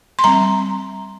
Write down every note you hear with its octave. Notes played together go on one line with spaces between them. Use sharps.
C6
G3 C4 A#5